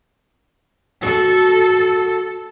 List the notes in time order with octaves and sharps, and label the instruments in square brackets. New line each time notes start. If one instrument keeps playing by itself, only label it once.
[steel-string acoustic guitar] F#4 [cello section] A4